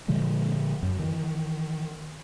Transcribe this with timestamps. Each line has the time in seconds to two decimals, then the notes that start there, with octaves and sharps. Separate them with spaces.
0.08 A#2 D3 F3 G#3
0.83 F#2
0.99 D#3 E3